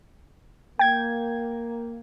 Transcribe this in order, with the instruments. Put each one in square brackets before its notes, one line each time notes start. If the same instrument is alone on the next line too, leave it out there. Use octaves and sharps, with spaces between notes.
[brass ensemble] A#3 [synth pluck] G5 G#6